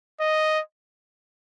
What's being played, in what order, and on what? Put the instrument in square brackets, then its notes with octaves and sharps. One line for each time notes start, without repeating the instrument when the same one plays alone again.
[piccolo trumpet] D#5